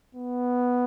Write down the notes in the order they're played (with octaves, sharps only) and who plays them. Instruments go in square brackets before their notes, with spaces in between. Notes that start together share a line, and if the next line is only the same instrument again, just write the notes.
[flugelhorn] B3